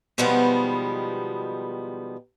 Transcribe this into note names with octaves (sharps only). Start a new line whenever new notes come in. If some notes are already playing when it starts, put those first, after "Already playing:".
B2 D#3 F3 G3 G#3 B3